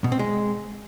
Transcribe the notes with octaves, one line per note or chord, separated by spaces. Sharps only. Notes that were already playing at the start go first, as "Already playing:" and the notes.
B2
C4
G#3